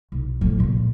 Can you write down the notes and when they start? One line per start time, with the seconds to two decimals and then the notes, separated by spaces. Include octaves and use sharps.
0.12 B1
0.41 A2 F3
0.58 A#2 B3